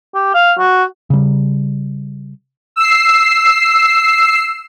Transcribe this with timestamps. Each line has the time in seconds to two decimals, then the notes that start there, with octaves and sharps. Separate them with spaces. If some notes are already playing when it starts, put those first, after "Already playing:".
0.14 G4
0.34 F5
0.59 F#4
1.10 C#3 G3
2.76 E6 C7